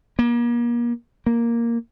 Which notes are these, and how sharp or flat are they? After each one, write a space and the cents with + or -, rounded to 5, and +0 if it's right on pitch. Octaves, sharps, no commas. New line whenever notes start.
A#3 +35
A#3 +0